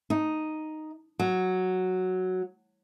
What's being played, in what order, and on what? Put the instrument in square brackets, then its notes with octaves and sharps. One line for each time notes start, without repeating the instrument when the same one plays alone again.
[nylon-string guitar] D#4
F#3